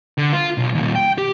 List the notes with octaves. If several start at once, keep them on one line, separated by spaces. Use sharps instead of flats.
D3
F4
B1
D#2 A#2
G5
G4